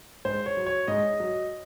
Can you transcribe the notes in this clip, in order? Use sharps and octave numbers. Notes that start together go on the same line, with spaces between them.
G#2 C5
C#5
F#3
C#5
G#2 D#5
F#3